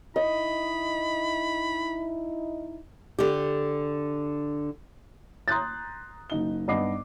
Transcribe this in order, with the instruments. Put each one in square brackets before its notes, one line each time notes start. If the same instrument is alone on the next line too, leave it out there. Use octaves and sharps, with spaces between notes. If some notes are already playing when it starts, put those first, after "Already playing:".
[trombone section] D#4 E4 [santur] D#5 [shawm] B5
[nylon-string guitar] D3 G4
[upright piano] A#5 C6 D#6 F#6 G6 A6
F#1 D#4 G7
G2 B3 D#4 D#5 D6 C7